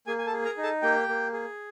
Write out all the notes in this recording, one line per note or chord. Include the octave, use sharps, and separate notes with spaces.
A#3 G#4 G#5
G#5
A4 A5
G#4
A#4 A#5
D#4
A4 A5
A#3 G4 G5
A#3
G#4